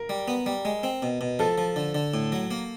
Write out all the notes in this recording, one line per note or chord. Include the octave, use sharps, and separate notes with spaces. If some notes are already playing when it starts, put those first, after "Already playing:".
Already playing: A#4
G3
B3
G3
G#3
C4
B2
B2
F3 A4
F3
D3
D3
A2
F#3
A#3